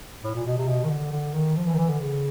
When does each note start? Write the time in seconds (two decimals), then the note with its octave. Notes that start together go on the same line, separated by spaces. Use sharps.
0.24 A2
0.35 A#2
0.46 B2
0.57 C3
0.68 B2
0.84 D#3
0.90 D3
1.12 D3
1.34 D#3
1.56 F3
1.67 E3
1.73 D#3
1.78 E3
1.90 D3
2.00 C#3